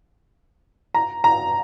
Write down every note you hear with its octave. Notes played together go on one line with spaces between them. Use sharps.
A#5
A#5